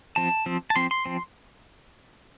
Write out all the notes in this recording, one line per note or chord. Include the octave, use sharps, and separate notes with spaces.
F3 C4 A5
F3 C4
A5
F3 C4 C6
C6
F3 C4